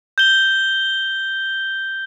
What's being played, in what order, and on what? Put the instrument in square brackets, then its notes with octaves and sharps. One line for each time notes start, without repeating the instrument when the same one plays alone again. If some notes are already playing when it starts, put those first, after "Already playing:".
[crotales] G6 G7